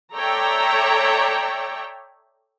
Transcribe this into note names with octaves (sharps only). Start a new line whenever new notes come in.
A4 C#5 D5 E5 G5 A#5